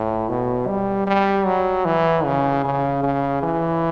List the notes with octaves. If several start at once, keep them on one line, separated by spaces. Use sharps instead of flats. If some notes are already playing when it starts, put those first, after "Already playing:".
Already playing: A2
B2
G3
G3
F#3
E3
C#3
C#3
C#3
E3